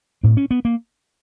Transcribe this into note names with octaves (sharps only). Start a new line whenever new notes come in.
A2 C4
C#4
B3
A#3